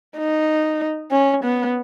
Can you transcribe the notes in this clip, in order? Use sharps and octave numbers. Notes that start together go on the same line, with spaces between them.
D#4
C#4
B3